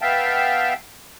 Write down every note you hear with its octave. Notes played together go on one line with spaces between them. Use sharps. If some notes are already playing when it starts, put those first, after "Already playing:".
B3 E5 F5 G5 A5